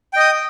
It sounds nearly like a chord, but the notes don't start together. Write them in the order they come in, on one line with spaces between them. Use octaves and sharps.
G5 D#5 D#6